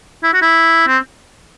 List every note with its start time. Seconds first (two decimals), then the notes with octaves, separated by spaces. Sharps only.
0.23 E4
0.33 F#4
0.42 E4
0.87 C4